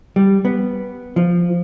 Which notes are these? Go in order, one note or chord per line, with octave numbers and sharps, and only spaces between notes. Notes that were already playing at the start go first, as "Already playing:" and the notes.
G3
B3
F3